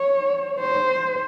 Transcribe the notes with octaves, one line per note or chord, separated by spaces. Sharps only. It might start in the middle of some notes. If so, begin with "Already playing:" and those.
Already playing: C#5
C5